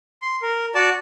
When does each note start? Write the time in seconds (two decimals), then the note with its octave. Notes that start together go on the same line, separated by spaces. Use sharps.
0.22 C6
0.42 A#4
0.75 F#4 D5 A5